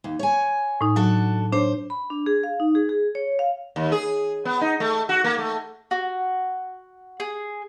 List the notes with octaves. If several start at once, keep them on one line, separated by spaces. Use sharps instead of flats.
D#2
C#5 G#5
A2 D#4
F#3 D4 F#4 A4
D4 C5 C#5
B5
D4
G#4
F5
D#4
G#4
G#4
C#5
F5
D#2
G#4
B3
D#4
A3
F#4
A#3
A3
F#4
G#4